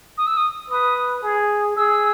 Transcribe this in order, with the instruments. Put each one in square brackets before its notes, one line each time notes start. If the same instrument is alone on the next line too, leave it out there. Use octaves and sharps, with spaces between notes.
[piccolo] D#6
E6
D#6
[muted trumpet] B4 [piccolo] D#6
[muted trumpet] G#4
[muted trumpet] G#4 [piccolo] E6